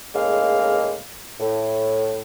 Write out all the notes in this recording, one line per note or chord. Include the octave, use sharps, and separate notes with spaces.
A2 C#3 G#3 A#3 D#4 F5
A2